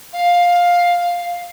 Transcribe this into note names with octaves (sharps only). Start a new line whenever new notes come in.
F5